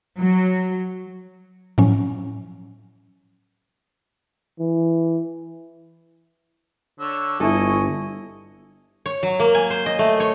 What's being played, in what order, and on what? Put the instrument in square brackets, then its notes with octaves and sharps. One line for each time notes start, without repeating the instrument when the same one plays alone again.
[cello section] F#3
[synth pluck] A2 F3 F#3 C#4
[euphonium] E3
[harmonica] D3 C#5 E6
[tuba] G1 [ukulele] E4 A4 [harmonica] D#5 G#5 C#6
[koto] C#5
F#3
A#3
G#5
C5
D#5
A3
C#5